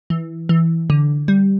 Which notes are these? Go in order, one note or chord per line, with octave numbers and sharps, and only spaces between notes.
E3
E3
D3
G3